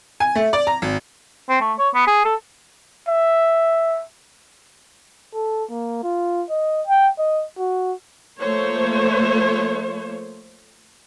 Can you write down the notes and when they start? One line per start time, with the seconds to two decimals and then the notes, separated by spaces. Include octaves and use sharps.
0.20 G#5
0.35 A3
0.53 D5
0.67 A#5
0.82 G#1
1.49 C4
1.60 A3
1.78 C#5
1.94 B3
2.07 G#4
2.25 A4
3.08 E5
5.34 A4
5.70 A#3
6.03 F4
6.50 D#5
6.87 G5
7.19 D#5
7.58 F#4
8.39 F3 A3 A#3 C5 C#5